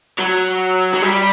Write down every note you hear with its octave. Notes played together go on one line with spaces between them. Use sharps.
F#3
F#3
G3